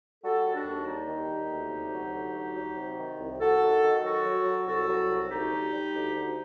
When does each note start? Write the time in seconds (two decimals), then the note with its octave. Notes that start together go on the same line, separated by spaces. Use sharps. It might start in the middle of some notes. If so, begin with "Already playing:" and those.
0.23 G3 F#4 A4
0.45 D#2
0.55 D4 F#4
0.65 D#2
0.86 G3 D#4 G4
1.08 D#3
1.29 D#2
1.50 D2
1.70 C3
1.92 F#3
2.13 D2
2.34 F#3
2.55 F#3
2.77 C3
2.98 D#3
3.19 C2
3.40 C2 F#4 A4
3.61 D#3
3.82 D#3
4.03 F#3 F#4 A4
4.25 F#3
4.45 F#3
4.66 C2 F#4 A4
4.88 F#3
5.09 C2
5.30 D2 D#4 G4
5.51 D2
5.72 G3
5.94 D2
6.14 D2